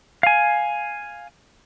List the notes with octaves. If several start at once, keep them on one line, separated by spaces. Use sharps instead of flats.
F5 G#5